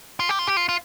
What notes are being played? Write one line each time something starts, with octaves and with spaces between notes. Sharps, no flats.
F4
G4
F4
G4
F4
F4